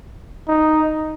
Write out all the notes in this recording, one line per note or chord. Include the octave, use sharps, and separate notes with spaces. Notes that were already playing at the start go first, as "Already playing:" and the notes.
D#4